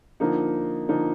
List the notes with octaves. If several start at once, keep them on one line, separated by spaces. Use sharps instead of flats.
D3 F3 A#3 D#4
D3 F3 A#3 D#4